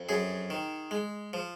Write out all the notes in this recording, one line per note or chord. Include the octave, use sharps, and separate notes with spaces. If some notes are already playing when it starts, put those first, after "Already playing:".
Already playing: F2
F#2 G#4
D#3
G#3
F3